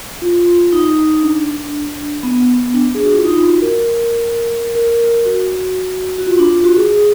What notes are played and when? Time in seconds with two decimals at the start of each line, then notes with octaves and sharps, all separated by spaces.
0.22 F4
0.72 D#4
1.23 D4
2.23 B3
2.74 D4
2.95 G#4
3.05 F#4
3.15 F4
3.24 D#4
3.37 F4
3.49 F#4
3.62 A#4
4.75 A#4
5.25 F#4
6.18 F#4
6.27 F4
6.39 D4
6.51 F4
6.64 F#4
6.77 G#4